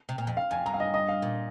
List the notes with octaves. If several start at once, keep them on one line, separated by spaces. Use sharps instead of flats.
C3
A#2
F2
F5
F2 G#5
G2 A#5
F5
D#5
D#5
F5
A#2